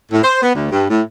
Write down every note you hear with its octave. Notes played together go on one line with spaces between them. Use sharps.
A2
C5
B3
D2
G2
A2